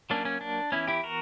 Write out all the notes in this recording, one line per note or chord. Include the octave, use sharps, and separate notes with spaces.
F#3 A#3 C#4 D4
C#4
D4
E3 B3 C#4 E4
E4 G4
F#4 A#4